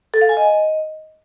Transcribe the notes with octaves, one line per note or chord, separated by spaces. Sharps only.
A4
F5
G#5
D#5